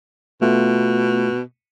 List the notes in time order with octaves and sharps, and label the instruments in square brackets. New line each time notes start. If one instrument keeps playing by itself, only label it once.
[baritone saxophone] B2 [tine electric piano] A3 B3 F4